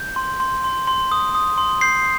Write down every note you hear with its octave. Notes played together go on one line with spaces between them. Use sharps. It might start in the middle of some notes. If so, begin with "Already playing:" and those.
Already playing: G6
C6
C6
C6
C6
D#6
D#6
C6
G6 C7